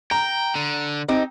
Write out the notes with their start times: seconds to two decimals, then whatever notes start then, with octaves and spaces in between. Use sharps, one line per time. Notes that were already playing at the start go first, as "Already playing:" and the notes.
0.11 G5 A#5
0.55 D3
1.08 C4 D#4 G4